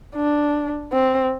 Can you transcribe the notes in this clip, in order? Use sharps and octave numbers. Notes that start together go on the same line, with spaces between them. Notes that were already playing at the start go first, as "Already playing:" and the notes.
D4
C4